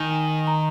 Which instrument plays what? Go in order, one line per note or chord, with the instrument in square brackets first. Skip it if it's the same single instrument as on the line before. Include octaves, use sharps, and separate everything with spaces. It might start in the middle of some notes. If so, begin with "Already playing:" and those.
Already playing: [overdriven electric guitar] D#3 [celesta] G#5
[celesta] G#5
A#5